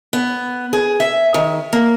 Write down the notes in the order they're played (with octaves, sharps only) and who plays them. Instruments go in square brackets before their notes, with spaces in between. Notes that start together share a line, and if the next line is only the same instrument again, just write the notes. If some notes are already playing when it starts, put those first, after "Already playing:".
[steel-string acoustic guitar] B3
G#4
E5
D#3
A#3